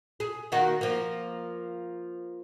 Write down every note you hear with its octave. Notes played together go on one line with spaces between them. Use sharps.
G#4
D#3 A#3 F#4
F3 A#3